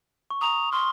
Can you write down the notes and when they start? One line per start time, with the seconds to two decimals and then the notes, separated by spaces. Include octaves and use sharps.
0.30 C#6
0.41 A#5 D#6
0.72 C6 F6